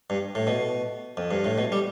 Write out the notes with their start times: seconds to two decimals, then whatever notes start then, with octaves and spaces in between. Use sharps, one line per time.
0.10 G2
0.35 A2
0.47 B2
1.17 F2
1.31 G2
1.45 A2
1.58 B2
1.72 G3